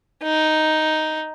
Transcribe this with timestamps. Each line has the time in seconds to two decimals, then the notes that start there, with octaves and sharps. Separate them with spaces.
0.23 D#4